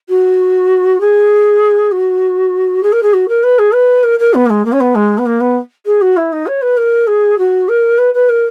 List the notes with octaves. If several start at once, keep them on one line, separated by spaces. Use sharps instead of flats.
F#4
G#4
F#4
G#4
A#4
G#4
F#4
A#4
B4
G#4
B4
A#4
A#4
B3
A#3
G#3
A#3
C#4
B3
G#3
B3
A#3
B3
G#4
F#4
E4
D#4
C#5
B4
A#4
G#4
F#4
A#4
B4
B4
A#4